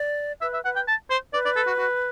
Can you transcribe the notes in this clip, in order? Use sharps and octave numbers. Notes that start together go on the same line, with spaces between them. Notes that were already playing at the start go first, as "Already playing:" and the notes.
Already playing: D5
B4 E5
E5
B4 F#5
G5
A5
C5
B4 D5
D5
A4
F#4
F#4